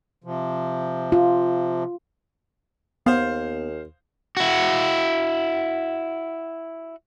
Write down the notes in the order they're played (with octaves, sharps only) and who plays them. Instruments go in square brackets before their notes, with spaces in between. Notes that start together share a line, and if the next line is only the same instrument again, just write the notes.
[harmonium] C3 F3
[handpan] F4
[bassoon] D#2 [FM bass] B3 [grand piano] C5 F5
[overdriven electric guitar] E4 F#4